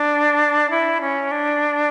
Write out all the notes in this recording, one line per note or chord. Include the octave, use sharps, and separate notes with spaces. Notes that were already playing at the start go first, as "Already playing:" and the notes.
Already playing: D4
E4
C#4
D4